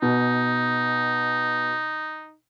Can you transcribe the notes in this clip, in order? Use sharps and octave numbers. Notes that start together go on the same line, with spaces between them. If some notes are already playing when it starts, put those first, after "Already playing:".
B2 D#4